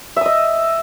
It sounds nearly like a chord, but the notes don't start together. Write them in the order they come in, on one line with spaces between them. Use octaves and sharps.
E5 D#6 D#5